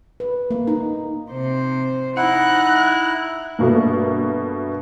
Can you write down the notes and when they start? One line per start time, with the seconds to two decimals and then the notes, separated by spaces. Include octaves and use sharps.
0.20 B4
0.51 A#3
0.67 D#4
1.32 C3 C5
2.17 D#4 E4 F#5 F#6
3.59 G2 B2 A3 A#3